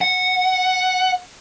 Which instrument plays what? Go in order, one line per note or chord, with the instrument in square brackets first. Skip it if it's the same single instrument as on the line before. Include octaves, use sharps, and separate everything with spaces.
[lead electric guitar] F#5